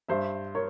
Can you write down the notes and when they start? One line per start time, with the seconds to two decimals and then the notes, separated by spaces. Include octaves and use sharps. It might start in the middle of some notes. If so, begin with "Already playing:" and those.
0.08 G2 C5 E5
0.55 A#4 C#5